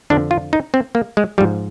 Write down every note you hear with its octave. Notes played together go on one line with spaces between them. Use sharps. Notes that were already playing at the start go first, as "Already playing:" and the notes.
F2 D3 F3 D4
F4
D#4
C4
A#3
G#3
G#2 F3 G3